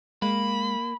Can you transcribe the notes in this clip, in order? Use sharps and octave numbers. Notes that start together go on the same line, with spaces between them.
G#3 A#3 B5